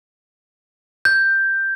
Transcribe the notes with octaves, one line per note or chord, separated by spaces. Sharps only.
G6